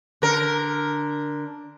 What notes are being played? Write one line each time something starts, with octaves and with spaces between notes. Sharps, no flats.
D3 A#4